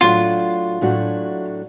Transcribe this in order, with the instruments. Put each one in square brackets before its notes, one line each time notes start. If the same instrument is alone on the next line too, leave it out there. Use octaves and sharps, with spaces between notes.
[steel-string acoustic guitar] A2 F#3 A3 D4 F#4 [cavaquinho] F4
[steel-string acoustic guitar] A2 F#3 A3 D4 F#4